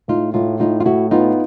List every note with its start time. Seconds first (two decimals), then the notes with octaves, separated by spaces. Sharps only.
0.08 A2 D#4 F4
0.34 A2 D#4 F4
0.60 A2 D#4 F4
0.80 F4
0.86 A2 E4 F#4
1.11 B3 D#4 F4